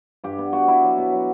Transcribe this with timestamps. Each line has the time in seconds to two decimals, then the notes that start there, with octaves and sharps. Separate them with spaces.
0.24 G2 G4
0.38 B3
0.53 B3 F#4
0.68 B3 E4
0.83 F#3
0.98 B2
1.12 F#3